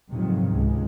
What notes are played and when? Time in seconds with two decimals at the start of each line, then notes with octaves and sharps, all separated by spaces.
0.12 F2 G#2 C3 D#3 F#3
0.52 C#2 G#3